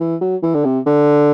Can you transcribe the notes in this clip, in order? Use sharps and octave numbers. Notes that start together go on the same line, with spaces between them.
E3
F#3
E3
D3
C3
D3